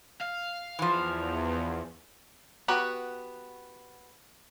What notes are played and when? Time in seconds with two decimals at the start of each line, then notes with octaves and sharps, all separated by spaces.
0.21 F5
0.79 E2 E3 F3
2.68 B3 F#4 G4 B4